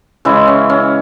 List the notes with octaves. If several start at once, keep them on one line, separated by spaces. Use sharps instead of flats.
C#3 E3 G#3 E4
C#4
C#4